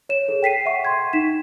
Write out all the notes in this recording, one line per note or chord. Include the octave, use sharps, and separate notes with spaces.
C#5 E7
G#4 A4
G5 B6 C7 D#7
E5 F#5 C#6
C6 C#6 G#6
D#4 B6 E7